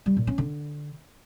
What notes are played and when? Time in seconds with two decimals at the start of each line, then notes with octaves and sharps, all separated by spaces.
0.06 G3
0.17 A#2
0.27 C#4
0.38 D3